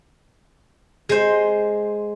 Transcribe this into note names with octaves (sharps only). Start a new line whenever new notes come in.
G#3 C5